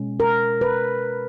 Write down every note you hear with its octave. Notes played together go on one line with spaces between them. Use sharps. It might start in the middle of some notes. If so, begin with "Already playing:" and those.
Already playing: B2 G#3 C#4
A#4
B4